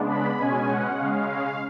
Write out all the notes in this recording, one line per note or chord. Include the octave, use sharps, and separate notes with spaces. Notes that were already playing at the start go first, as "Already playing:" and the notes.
Already playing: C#3 G#3 B3 D4
B5
B2 G#3 C#4 G#5
F#5
C#3 G#3 C#4 F5